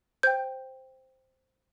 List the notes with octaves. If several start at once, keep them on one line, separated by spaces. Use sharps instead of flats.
C5 G5 G6